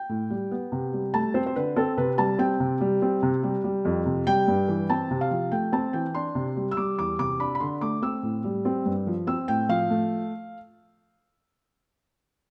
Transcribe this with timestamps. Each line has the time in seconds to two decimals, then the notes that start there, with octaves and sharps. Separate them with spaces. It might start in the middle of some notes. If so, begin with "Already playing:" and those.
Already playing: G5
0.09 A2
0.30 G3
0.51 B3
0.72 C3
0.93 G3
1.14 A3 A5
1.34 C4 C5
1.46 C5
1.56 D3 B4
1.76 C4 A4
1.97 C3 B4
2.18 G3 A5
2.39 C4 G5
2.60 C3
2.81 G3
3.02 C4
3.22 C3
3.43 G3
3.64 G3
3.85 F2
4.06 C3
4.27 G3 G5
4.48 G2
4.68 E3
4.90 C4 A5
5.11 C3
5.21 F5
5.31 F3
5.52 A3 G5
5.72 C4 A5
5.93 E3 G5
6.14 D4 C6
6.35 C3
6.57 G3
6.71 E6
6.77 G3 D6
6.98 E2 D6
7.19 C3 D6
7.40 D4 B5
7.55 B5
7.60 D3 C6
7.81 A3 D6
8.02 C4 E6
8.23 A2
8.44 G3
8.65 C4
8.86 G2
9.07 F3
9.27 C4 E6
9.48 A2 G5
9.69 F3 F5
9.90 A3